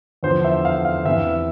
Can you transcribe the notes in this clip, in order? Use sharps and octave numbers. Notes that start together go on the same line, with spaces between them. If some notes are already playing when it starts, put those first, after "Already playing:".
E2 D3 F3 C5
E5
F5
F5
E2 C3 E3 E5